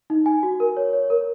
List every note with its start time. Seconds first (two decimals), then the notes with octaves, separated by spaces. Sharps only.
0.10 D#4
0.26 G#5
0.43 F#4
0.60 A#4
0.77 C#5
0.93 C#5
1.10 A#4